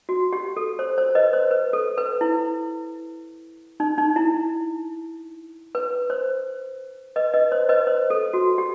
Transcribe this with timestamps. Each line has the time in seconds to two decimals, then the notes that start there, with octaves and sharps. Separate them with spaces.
0.09 F#4
0.33 G4
0.57 A4
0.79 C5
0.98 C5
1.15 B4 D#5
1.33 C5
1.51 B4
1.73 A4
1.98 B4
2.21 E4
3.80 D#4
3.98 D#4
4.16 E4
5.75 B4
6.10 C5
7.16 B4 D#5
7.34 B4 D#5
7.52 C5
7.69 B4 D#5
7.87 C5
8.10 A4
8.33 F#4
8.58 G4